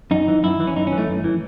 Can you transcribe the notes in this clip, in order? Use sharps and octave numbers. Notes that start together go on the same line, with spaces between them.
F#2 D#4
E3
F#2 E4
E3
C#4
F#2 D#4
C#4
E3
A3
F#2
E3